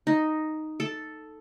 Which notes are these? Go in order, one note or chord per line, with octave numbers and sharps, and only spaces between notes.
D#4
A4